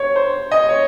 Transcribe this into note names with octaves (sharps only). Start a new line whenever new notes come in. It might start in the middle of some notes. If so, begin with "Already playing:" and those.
Already playing: C#5
C5
D#5
C#5